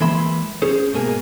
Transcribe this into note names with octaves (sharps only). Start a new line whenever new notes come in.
E3 G#3 A#3 E5 B5 C6
C#4 G#4 C5
G#2 B2 A#3 G#4